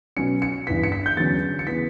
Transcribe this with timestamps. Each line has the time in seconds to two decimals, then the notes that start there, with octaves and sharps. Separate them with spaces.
0.17 B2 F#3 C#4 C#7
0.42 C#7
0.67 G2 E3 B3 B6
0.83 C#7
0.92 B6
1.06 G6
1.17 E2 D3 F#3 C#4 A6
1.59 C#7
1.67 C#3 E3 B3 B6